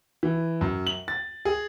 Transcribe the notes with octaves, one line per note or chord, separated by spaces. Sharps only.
E3
F#2
F#7
A6
G#4